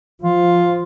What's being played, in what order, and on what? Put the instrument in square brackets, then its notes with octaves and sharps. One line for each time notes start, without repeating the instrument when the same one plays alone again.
[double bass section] F3 [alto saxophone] F4